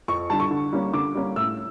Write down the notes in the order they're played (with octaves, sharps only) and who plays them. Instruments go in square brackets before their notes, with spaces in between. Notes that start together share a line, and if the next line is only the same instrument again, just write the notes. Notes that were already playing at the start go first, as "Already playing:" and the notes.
[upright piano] F2 C#6
D3 G3 A5
C#6
D3
G3 A#3 C#4
D3 D6
G3 A#3 C#4
A2 E6